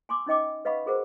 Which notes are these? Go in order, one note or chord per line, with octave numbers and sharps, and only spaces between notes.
G#5 C6 D6 E6
C#4 D#4 D#5 G5 D6
B4 D#5 F5 F#5 B5 C#6
F#4 G#4 A#4 C5 F#5